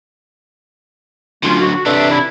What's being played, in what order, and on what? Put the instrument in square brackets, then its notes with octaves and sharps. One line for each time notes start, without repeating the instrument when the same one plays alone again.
[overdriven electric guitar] D3 F#3 [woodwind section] A3 C#4 F4
[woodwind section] F#4
[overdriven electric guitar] C3 D4 [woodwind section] A4 B4 E5
[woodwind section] E4